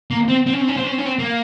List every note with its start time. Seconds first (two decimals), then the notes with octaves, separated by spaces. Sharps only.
0.11 A#3
0.28 C4
0.47 C4
0.54 C#4
0.61 C4
0.68 C#4
0.77 C4
0.84 C#4
0.91 C4
0.98 C#4
1.06 C4
1.19 A#3